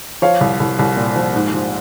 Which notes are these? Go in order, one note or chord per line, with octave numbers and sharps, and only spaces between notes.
F3 C#5 F5
C2
C2
C2
A#2
F3
G#2
F3